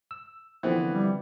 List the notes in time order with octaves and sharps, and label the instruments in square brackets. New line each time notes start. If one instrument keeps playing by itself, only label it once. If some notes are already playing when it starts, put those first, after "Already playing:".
[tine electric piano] E6
[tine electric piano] D3 F3 C4 [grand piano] E3 B3
[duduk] G3